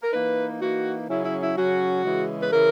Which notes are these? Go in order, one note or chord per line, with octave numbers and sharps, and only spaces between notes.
A#4
E3 A#3 D#4 B4
E3 A#3 D#4 F#4
C#3 F#3 C#4 E4
E4
E4
C#3 F#3 C#4 F#4
C#3 E3 G#3
B4
C#3 E3 A#4